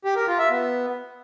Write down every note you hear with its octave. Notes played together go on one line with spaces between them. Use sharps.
G4
A#4
F4
E5
B3